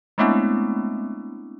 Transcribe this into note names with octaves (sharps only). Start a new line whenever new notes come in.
G#3 A3 B3 C4 D4 E4